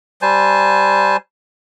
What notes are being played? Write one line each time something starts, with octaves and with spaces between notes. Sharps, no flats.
G3 C5 G#5 A5